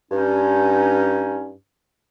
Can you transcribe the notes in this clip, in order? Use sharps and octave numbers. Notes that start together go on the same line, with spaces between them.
G2 C#4 D#4